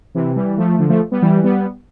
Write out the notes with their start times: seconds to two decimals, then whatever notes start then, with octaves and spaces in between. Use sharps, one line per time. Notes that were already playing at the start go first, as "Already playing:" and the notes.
0.15 C3 E3
0.36 E3 G3
0.58 F3 A3
0.79 D3 F3
0.89 F3 A3
1.11 G3 B3
1.22 E3 G3
1.44 G3 B3